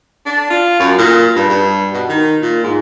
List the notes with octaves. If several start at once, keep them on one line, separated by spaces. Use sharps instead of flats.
D4
F4
F#2
A#2
G2
G2
B2
D#3
A#2
G#2